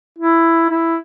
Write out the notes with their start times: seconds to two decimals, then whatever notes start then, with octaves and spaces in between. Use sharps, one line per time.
0.19 E4
0.70 E4